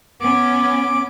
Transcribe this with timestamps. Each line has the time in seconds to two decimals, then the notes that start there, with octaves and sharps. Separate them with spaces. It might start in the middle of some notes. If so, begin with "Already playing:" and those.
0.20 B3 C#4 D6